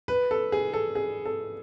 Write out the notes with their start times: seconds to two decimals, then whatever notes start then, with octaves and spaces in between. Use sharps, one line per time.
0.08 B4
0.31 A4
0.52 G#4
0.73 A4
0.95 G#4
1.26 A4